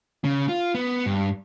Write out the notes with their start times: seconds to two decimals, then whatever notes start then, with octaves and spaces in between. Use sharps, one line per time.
0.24 C#3
0.49 F4
0.75 B3
1.06 G2